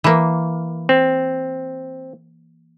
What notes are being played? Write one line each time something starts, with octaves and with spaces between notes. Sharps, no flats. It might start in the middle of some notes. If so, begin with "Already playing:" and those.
E3 A#3
C4